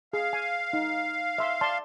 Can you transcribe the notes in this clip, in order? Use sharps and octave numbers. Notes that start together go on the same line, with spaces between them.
G#4 F5
G#5
D#4
E5 C6 E6
D5 A5 C6